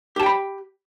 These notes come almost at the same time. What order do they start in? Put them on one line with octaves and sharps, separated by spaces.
G4 A5 G5 B5